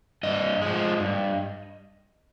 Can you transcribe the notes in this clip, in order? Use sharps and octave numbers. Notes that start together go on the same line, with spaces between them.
G2 D#5
F3 G#3
G2